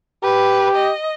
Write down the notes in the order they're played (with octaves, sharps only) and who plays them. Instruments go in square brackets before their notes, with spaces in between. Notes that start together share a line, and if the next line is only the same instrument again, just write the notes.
[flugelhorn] G4 [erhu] B4
[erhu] D#5